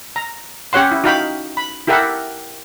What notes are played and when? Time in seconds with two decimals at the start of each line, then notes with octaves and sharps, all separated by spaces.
0.16 A#5
0.73 C#4 G4 C#5 F#5 C6
0.91 E4
1.04 D#4 F#4 F5 G5 B5
1.57 B5
1.87 E4 G4 A4 A#4 E5 F#5